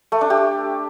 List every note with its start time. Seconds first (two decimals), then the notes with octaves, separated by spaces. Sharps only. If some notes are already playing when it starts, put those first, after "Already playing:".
0.12 A3
0.21 D4
0.30 G4